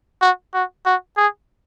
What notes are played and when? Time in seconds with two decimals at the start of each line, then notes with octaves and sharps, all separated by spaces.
0.21 F#4
0.54 F#4
0.86 F#4
1.17 G#4